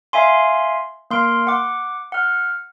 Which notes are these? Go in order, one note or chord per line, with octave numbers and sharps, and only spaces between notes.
E5 F5 G#5 C6
A#3 C6 F6 D7
F#5 D6
F#5 F6